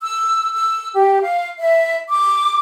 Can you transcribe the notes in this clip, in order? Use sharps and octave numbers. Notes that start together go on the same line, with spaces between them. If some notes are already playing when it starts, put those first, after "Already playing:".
E6
E6
G4
F5
E5
D6